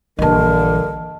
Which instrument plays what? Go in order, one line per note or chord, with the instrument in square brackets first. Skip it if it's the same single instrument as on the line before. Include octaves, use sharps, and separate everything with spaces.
[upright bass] A#1 E3 [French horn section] G2 D3 [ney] A#4 [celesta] D#5 A5